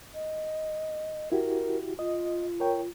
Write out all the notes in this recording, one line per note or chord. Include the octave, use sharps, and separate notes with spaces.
D#5
E4 F#4 G4 A#4
F4 D#5
A#4 C#5 G5